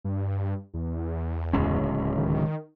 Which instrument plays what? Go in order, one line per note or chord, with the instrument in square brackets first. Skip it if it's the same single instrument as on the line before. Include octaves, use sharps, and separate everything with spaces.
[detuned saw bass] G2
E2
[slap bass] D1 C#2 C#4
[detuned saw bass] D#3